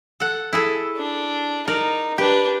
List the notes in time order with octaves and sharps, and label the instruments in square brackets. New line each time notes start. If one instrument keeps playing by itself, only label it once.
[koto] A4 F#5
E4 G#4 A4
[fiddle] D4
[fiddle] D#4 [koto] A#4 D5
[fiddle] D4 B4 [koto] G4